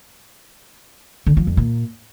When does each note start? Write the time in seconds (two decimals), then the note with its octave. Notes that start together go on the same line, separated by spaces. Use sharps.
1.27 D3
1.37 F3
1.47 F2
1.57 A#2